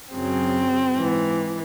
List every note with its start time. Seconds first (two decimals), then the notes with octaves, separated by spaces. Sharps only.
0.13 F#2 C#3 F#3 C4
0.95 G#2 E3